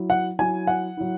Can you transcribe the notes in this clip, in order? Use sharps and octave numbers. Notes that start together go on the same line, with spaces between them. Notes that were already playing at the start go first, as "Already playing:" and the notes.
Already playing: F#3 E4
F#5
F#3 E4 G#5
F#5
F#3 E4